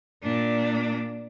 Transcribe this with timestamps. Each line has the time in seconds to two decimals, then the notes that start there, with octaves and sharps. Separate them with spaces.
0.23 A#2 D4